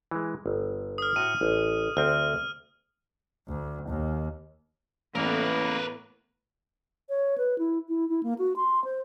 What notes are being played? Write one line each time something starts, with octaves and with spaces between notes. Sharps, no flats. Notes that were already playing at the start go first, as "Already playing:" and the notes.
E3 G#3
G1
D#6 F6
A2 F#4 F#5 D#7
A1
D2 C4 G5 F6
D2
D#2
A1 A2 A#3 B3 A#4 B4
C#5
B4
E4
E4
E4
A#3
F#4
C6
C5